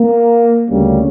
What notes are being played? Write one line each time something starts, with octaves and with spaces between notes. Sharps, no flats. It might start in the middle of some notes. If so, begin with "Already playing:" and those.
Already playing: A#3
D2 C#3 G3 A#3 C#4